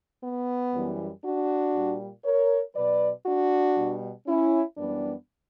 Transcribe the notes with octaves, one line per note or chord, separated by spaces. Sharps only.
B3
F#2 E3 G3
D4 F#4
A#2 G3
A#4 C#5
B2 F#3 B4 D5
D4 F#4
B2 G3
C#4 E4
F#2 E3 G3 B3 D4